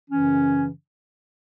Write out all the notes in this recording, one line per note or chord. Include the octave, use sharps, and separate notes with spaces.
F#2 C#3 E3 C#4